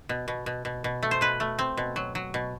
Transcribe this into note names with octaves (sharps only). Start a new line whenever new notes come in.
B2
B2
B2
B2
B2
A3
C5
B2 B4
A3
C4
B2
F#3
F#3
B2